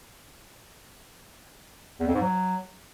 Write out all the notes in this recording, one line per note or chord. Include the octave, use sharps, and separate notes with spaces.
E2
F2
G#2
F#3